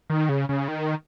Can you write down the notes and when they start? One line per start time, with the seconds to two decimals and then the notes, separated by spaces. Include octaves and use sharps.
0.10 D#3
0.29 C#3
0.49 C#3
0.68 D#3